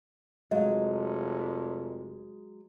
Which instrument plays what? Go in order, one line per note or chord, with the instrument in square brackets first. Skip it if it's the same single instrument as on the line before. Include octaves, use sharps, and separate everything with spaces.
[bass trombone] F1 [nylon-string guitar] F#3 G#3 F5 [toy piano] D#5